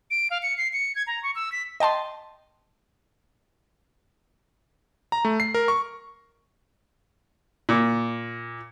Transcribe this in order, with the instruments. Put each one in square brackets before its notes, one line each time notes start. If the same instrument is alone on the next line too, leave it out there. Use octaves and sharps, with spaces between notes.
[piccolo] D7
F5
C#7
C7
C#7
G#6
A#5
C#6
E6
B6
[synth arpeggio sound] D#5 G5 A5 C6
[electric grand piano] A#5
A3
C7
A#4
C#6
[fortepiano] A#2